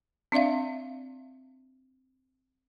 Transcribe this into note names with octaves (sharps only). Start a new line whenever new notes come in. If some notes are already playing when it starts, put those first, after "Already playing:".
C4 D4 D5 E5 F5